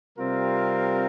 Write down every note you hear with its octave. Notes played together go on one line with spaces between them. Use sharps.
C3 G3 C4 F4 A#4